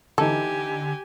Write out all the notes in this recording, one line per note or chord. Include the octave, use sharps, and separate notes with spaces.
D3 E3 D#4 G4 A4 G#5